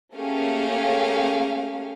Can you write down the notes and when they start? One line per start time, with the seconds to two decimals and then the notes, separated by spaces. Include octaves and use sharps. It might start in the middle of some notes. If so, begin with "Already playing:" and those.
0.15 A3 A#3 C#4 G4 G#4 F5